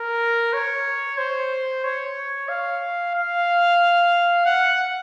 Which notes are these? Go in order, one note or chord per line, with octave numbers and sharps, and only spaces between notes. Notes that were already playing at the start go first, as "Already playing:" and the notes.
Already playing: A#4
C#5
C5
C#5
F5
F5
F#5